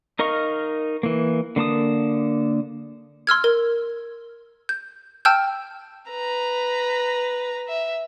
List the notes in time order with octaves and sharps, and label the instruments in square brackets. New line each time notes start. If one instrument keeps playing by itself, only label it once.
[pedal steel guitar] D#4 A#4 D#5 F5 C#6
E3 A#3
D3 A#3 A5 D#6
[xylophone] C6 E6 F6 G#6
A#4
G6
G5 A5 E6 F6 G6
[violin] B4 A#5
E5